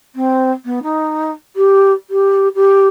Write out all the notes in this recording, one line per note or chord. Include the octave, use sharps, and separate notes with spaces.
C4
B3
D#4
G4
G4
G4